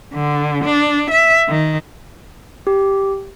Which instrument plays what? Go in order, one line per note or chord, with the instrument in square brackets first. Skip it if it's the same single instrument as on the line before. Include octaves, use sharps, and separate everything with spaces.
[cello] D3
D4
E5
D#3
[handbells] G4